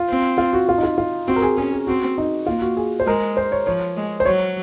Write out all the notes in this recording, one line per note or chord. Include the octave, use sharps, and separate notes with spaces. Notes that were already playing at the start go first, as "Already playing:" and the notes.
Already playing: F4
C4
F4
F#4
F4
D#4
F4
F4
C4 F#4
A#4
G#4
C#4 G#4
G#4
C4 F#4
D#4
A#3 F4
F#4
G#4
C5
G#3 A#4
C5
C#5
F3 C#5
G#3
C5
F#3 C#5